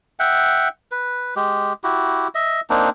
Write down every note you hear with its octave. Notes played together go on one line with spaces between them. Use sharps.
E5 F#5 G5
B4
G#3 G4
E4 F#4 G4
D#5 E5
A#3 C4 D4 D#4